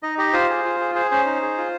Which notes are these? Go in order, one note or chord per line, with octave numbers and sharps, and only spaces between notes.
D#4 D#5
G4 D#5
F4 C5
G#4
F4
G#4
G#4 C5
C#4 C5
D#4
G#4
F4